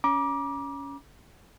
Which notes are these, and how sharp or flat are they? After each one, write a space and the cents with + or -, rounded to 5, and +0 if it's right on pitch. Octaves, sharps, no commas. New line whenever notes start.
C#4 +15 A#5 +40 D6 +0